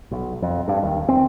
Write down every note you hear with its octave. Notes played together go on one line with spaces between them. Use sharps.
B1
F2
G2
D#2
C4